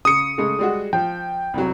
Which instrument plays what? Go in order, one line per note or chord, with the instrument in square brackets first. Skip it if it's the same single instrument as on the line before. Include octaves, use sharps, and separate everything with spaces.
[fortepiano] C#3 [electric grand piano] D#6 C#7
[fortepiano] C#3 G#3 A3
G3 G#3 F#4
[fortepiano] F3 [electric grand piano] G5
[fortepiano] C2 F2 F#3